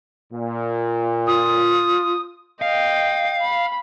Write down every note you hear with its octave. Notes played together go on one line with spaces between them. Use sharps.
A#2
F4 D#6
D#5 F5 G5
B5